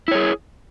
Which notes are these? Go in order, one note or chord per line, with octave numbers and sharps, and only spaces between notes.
E4 G#4 C#5